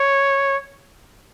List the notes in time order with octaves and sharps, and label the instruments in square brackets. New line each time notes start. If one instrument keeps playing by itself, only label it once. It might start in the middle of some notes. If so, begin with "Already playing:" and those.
Already playing: [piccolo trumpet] C#5